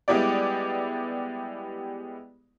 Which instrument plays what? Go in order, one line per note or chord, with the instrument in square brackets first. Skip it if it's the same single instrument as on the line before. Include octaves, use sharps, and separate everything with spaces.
[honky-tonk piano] G3 G#3 B3 E4 G4 D5